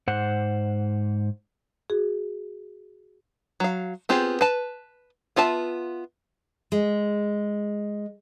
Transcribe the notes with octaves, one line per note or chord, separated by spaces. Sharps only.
G#2 C5 F#5
F#4 G#4
F#3 F5
B3 C4 F4 G4 G#4
B4 A5
B3 F4 E5 A5
G#3